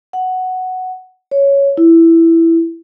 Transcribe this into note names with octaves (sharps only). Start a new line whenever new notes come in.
F#5
C#5
E4